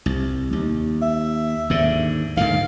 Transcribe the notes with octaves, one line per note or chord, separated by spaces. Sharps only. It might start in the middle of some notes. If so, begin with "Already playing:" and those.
C2
D#2
E5
D#2 G#2 D3
G#2 D3 D#3 F5